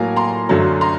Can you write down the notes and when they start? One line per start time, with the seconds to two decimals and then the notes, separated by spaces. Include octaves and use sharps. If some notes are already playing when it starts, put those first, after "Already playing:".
Already playing: A2 F#3 A#3 G#5 A#5
0.16 A#5 C6
0.49 F#2 D3 F#3 A3
0.81 A#5 C6